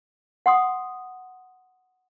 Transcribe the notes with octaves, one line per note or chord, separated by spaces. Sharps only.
F#5 C6 D#6